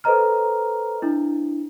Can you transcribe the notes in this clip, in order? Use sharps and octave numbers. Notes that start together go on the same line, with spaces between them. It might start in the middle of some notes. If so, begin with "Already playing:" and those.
A4 B4 C5 D#5 A#5 F6
D4 E4